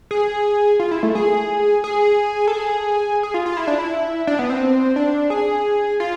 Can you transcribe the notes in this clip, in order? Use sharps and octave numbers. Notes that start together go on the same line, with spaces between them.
G#4
F4
E4
A3
G#4
G#4
A4
G#4
G#4
F4
F4
E4
D4
E4
D4
B3
C4
D4
G#4
F4